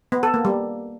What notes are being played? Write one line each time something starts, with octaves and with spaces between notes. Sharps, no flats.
B3
A4
A#3
G3